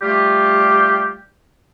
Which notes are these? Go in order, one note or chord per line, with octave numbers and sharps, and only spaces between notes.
G3 A3 F4 G4